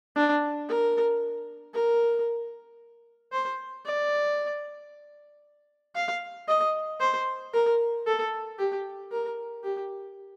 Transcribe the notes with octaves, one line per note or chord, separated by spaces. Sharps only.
D4
A#4
A#4
C5
D5
F5
D#5
C5
A#4
A4
G4
A#4
G4